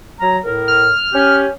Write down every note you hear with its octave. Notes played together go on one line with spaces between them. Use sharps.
F#3 A#5
A2 A#4
F6
C#4 G4